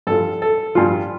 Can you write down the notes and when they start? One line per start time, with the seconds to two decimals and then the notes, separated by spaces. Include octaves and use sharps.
0.07 G2 F3 A4
0.42 A4
0.75 G2 F3 F4